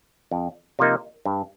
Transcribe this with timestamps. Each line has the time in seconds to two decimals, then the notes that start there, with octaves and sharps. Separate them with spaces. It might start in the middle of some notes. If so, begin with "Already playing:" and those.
0.31 F2
0.79 C3 F3 A#3 D#4
1.25 G2